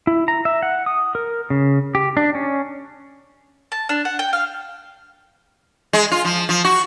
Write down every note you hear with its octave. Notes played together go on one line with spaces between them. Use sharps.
E4
A#5
E5
F#5
D#6
A#4
C#3
G4
D4
C#4
A5
D4
F#5
G5
F5
G#3
F4
F3
F3
F#4